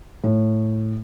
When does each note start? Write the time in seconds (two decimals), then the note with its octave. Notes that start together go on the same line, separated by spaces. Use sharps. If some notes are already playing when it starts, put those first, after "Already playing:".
0.24 A2